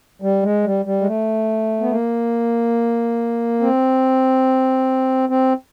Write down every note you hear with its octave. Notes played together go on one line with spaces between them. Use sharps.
G3
G#3
G3
G3
G#3
A3
B3
A#3
C4
C4